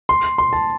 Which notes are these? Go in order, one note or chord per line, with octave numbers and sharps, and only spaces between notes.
C6
C6
A5